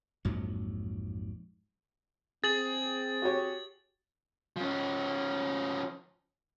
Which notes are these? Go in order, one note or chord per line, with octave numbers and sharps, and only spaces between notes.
A#1 F2 G#2 F#3
C4 G#4 A6 F#7
F#4 G4 C#5
F3 C#4